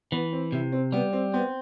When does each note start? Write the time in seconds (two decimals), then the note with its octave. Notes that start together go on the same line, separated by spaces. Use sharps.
0.12 E3 B3
0.32 C4
0.52 C3 E4
0.72 C4
0.92 G3 B3
1.13 C4
1.34 B3 C4